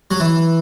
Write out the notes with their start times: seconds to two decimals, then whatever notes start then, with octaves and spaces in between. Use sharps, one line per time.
0.11 F#3
0.20 E3